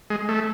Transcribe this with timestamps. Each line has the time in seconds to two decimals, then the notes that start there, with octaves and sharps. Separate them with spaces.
0.10 G#3
0.29 A3